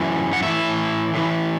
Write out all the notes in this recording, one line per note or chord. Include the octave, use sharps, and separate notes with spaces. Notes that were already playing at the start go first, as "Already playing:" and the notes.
Already playing: F#2 E3 E5
F#5
A2 E3 E5
A2 E3